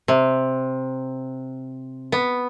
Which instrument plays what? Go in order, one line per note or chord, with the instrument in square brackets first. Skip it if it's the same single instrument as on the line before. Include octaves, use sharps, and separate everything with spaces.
[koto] C3
B3